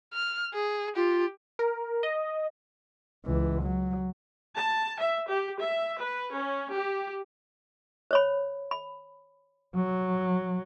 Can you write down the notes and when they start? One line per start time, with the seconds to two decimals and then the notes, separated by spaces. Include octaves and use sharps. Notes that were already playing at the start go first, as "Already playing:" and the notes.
0.14 F6
0.54 G#4
0.96 F4 G4
1.59 A#4
2.03 D#5
3.25 C#2 E3
3.63 F#3
4.55 A5
5.00 E5
5.29 G4
5.61 E5
6.01 B4
6.34 C#4
6.71 G4
8.11 C5 C#5 B5
8.71 B5
9.75 F#3